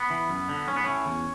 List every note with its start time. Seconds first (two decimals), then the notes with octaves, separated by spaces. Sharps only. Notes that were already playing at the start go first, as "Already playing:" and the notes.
Already playing: B3
0.10 E3
0.29 F#2
0.49 D3
0.67 B1 C#4
0.76 B3
0.84 A2 E3 C#4
1.06 E2